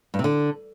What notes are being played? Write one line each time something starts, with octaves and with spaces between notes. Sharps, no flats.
G2
C3
D3